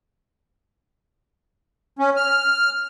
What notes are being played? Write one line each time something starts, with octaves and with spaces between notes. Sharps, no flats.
C#4
F6